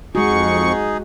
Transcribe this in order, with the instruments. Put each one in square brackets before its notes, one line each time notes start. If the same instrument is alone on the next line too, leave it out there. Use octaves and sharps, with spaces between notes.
[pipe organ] F2 C#6 [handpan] G#3 F#4 [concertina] D#4 G#4